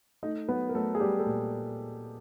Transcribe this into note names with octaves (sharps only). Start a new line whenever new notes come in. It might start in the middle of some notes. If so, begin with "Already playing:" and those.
A3 D#4 D#5
F#3 B3 B4
A#4
F#3 A3 A4
G#4
G3 A3 G4
A3 A4
A#2